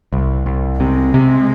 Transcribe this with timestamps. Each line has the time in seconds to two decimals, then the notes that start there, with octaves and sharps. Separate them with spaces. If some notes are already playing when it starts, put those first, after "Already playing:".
0.13 C2
0.46 C2
0.80 C3 G#3
1.14 C3